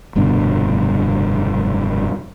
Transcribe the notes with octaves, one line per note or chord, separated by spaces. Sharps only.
F1 G2 B2 D3